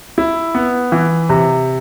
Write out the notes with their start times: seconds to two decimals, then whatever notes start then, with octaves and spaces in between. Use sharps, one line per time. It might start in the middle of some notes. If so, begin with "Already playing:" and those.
0.18 E4
0.55 B3
0.92 E3
1.29 C3